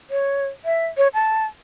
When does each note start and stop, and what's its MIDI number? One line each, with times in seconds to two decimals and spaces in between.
0.10 0.45 73
0.65 0.87 76
0.97 1.08 73
1.14 1.44 81